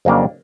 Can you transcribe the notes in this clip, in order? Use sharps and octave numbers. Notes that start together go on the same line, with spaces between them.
F2 C#3 F#3 A#3 D4